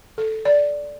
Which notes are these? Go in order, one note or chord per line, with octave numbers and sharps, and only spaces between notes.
A4
D5